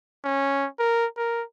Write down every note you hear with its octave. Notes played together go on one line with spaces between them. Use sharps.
C#4
A#4
A#4